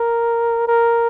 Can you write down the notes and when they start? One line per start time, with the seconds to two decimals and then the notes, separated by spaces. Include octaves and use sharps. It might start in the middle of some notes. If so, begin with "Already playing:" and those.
Already playing: A#4
0.68 A#4